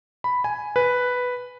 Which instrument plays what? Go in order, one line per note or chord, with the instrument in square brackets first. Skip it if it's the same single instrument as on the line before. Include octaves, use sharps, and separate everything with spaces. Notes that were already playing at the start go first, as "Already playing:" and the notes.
[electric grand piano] B5
G#5
B4